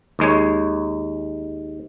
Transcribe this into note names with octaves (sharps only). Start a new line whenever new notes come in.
D#2 G#3 C#5